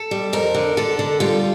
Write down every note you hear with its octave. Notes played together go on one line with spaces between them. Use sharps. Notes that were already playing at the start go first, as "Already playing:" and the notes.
Already playing: A4
G3
F2 A#4
D3
D3 A4
D3
G3 F4